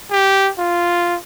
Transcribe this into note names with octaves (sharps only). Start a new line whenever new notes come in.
G4
F4